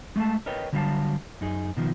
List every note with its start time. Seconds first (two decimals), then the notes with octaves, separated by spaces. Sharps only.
0.16 G#3 A3 E5 F5 A5
0.46 A#4 B4 C#5 D#5 G5
0.73 D3 F#3 G3 G4 F5 A5
1.41 F#2 D#4 G#4
1.77 B2 D#3 F3